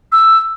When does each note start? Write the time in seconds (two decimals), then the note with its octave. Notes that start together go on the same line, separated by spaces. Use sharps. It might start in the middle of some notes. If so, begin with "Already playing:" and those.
0.12 E6